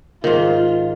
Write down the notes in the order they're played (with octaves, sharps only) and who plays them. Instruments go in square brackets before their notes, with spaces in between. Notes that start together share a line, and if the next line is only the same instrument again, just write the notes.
[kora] G#2 D#3 [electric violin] F4